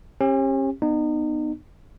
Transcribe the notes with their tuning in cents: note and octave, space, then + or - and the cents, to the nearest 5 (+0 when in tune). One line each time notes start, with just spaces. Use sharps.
C#4 -40 G4 +20
B3 +0 D#4 -30